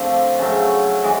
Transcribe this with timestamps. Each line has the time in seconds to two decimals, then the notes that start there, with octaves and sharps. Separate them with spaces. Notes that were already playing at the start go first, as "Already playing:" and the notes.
Already playing: D3 F3 A3 C4
0.39 C#3 F#3 A3
1.04 E3 G#3